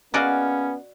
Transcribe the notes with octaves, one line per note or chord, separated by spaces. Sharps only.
A#3 B3 C#4 F#4 G#4 D5 D#5 F5